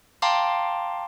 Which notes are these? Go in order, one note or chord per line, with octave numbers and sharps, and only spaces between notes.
F5 G5 A5 A#5 C6 D6